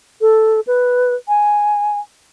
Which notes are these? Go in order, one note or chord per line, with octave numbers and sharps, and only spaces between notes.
A4
B4
G#5